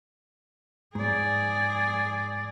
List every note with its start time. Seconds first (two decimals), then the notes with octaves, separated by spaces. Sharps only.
0.95 G#2 G#4 D5